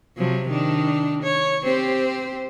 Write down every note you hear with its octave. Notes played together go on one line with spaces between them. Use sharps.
C3 F3 F#3
D#3 D4
C#5
C4 G4 C5